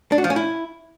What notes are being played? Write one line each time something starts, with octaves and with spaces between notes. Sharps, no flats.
D4
F#4
F3
C#4
E4